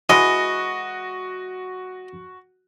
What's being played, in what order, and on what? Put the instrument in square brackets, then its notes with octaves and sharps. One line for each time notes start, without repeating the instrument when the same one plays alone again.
[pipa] E3 G#3 [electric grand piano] F#4 [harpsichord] D#5